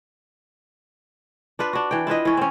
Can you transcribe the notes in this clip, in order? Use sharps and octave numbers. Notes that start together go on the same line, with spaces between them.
D4 F4 B4
D4 F#4
E3 G5
E4 F4 B4 D#5
E3 C#4
C4 C#4